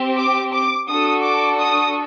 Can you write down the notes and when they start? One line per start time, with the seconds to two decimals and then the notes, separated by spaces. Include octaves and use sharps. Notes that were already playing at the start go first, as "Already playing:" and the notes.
Already playing: C4 G4
0.18 D6
0.54 D6
0.89 D4 F#4 A4 D#6
1.25 D6
1.60 D#6